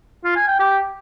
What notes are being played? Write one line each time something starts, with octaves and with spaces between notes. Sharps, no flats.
F4
G#5
G5
G4